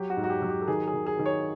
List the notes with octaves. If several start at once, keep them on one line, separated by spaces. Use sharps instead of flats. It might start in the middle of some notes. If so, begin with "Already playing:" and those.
Already playing: F#3 G4
F#4
G#2
F#4
G4
F#3
G4
A4
D#3 G#4
G#4
D#3
G#4
D#3
C#5